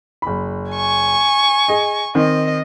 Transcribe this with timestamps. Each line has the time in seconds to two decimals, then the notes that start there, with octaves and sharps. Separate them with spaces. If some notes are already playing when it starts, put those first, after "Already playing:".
0.22 F#1 B5
0.71 G#5 C#6
1.68 G#4 D#5
2.15 D#3 C4 D#5